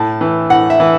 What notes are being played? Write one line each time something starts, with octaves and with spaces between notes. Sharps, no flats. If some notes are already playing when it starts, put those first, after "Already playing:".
Already playing: A2 A5
E3
A2 F#5
E5
E3